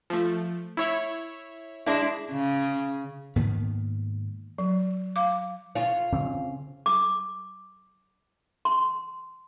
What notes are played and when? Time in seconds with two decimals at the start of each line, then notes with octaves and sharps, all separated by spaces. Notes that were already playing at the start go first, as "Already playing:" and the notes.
0.10 F3 A3
0.77 E4 C#5 E5
1.86 G#3 D4 E4
2.31 C#3
3.36 G#2 D#3 A#3 B3
4.58 F#3
5.16 F5 D6
5.75 F4 C#5
6.12 C#3 C4
6.86 D6
8.65 C6